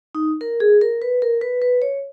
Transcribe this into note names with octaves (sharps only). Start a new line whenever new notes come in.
D#4
A#4
G#4
A#4
B4
A#4
B4
B4
C#5